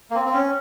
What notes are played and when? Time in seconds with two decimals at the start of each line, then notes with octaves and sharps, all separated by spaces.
0.11 A#3
0.15 C4
0.25 C4
0.34 C#4